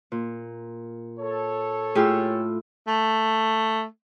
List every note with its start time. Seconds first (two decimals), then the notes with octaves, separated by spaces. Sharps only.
0.12 A#2
1.20 A4 C#5
1.95 A2 F4 G4 G#4 E6
2.87 A3